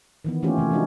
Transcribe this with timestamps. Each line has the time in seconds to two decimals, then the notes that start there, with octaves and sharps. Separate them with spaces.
0.25 D#3 E3 B3
0.43 E3 A3 A#3 C#4 F4 G4
0.58 C3 E3 A3
0.71 E3 F3 G#3 D4 D#4 F#4